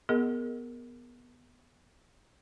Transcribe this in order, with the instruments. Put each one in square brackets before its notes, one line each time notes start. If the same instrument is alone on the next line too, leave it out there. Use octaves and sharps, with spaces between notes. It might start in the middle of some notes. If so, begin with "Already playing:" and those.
[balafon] B3 G#4 A#4 D#5